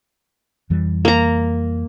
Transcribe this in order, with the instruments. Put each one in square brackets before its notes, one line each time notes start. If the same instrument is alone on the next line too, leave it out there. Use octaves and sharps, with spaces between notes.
[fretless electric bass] F2 E3 G3
[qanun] A#3 A#5